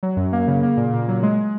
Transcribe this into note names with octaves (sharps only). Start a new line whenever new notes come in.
F#3
F#2
A#3
C#3
A#3
A#2
A#2
F#3
G#3